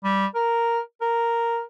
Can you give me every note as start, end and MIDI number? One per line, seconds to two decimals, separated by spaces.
0.04 0.26 55
0.35 0.79 70
1.01 1.62 70